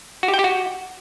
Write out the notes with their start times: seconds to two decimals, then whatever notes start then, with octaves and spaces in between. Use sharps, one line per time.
0.23 F#4
0.28 G4
0.34 G5
0.39 G4
0.44 F#4